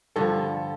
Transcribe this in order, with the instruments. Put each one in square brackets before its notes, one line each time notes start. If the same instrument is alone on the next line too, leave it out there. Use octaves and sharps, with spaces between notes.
[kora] G2 D3 F3 [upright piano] A4